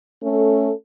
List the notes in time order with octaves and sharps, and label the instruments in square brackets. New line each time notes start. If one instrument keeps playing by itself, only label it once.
[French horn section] A3 C#4 A4